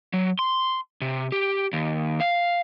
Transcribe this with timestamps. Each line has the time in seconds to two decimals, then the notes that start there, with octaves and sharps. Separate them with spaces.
0.13 F#3
0.39 C6
1.01 C3
1.32 G4
1.73 D#2
2.20 F5